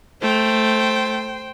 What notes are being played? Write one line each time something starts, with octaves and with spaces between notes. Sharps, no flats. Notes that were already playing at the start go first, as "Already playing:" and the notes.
A3 C5 G5